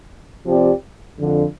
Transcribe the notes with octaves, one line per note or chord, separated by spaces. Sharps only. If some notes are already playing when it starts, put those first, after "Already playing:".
C3 F3 C4 G4 D5
F2 D3 F3